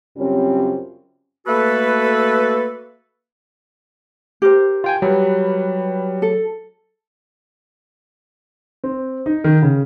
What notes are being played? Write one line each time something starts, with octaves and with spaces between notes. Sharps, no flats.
F#2 C#3 G3 C4 C#4 F4
A3 A#3 F#4 A4 B4
G4 A#4 C5
F4 G5 G#5
F#3 G3 B4
A4
C4
D#4
D#3
C#3